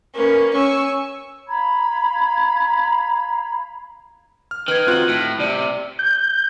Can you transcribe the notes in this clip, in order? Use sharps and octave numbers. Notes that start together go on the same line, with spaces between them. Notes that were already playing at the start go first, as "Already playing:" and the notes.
A#3 C#4 A#4 B4
C#4 G#5 C#6 E6
F5 A#5 B5 G#6
F6
D#3 B4 F6 G#6
C4 F4 F#4 F#6 F#7
A2 C#7
C3 D5
G6